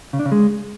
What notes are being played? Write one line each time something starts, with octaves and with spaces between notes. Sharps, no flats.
C#3
D4
C#3
G#3